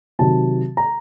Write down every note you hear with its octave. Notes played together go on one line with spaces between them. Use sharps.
C3 D#3 F#3 A5
A#5